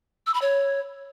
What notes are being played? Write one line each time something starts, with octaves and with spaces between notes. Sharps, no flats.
E6
B5
C#5